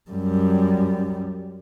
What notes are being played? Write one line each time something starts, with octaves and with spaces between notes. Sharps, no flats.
F#2 G3